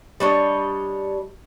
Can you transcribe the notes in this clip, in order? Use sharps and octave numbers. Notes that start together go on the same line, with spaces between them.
G3 D4 C#5 D#5